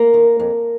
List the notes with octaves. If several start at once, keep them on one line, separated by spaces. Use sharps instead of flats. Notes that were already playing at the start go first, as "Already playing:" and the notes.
Already playing: A#3 A#4
D#3
F2